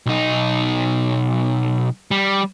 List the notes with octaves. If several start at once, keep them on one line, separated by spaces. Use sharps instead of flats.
B1 D#4
G3